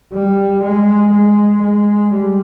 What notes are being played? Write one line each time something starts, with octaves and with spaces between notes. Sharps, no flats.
G3
G#3
G#3
G#3
G3